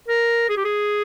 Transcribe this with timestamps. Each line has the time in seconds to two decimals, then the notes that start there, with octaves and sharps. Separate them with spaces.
0.08 A#4
0.50 G#4
0.57 G4
0.65 G#4